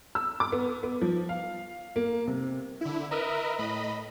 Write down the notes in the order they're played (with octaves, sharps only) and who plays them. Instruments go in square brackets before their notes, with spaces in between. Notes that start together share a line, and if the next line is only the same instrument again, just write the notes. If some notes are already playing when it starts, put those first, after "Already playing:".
[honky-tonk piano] E6
D6
B3
B3
F3
F5
A#3
C3
[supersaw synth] D3 E4
A#4 B4 D#5 E5
A2 D#5 B5